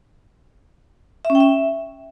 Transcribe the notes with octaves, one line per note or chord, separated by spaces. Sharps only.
E5
C#4
G5
E5